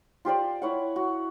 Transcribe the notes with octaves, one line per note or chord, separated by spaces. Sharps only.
F4 G4 C5 D5
E4 C#5 F#5
F#4